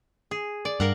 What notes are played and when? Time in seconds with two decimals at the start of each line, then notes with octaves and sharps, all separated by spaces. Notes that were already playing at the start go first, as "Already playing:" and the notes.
0.31 G#4
0.65 D5
0.80 G2 A#4 F5 F#5